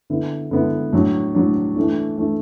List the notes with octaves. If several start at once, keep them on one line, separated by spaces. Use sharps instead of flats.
D3 B3 E4
D3 B3 E4
A2 F#3 D4
A2 F#3 D4
E3 A3 D4
E3 A3 D4